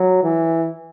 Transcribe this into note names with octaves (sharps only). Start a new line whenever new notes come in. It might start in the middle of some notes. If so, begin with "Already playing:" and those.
Already playing: F#3
E3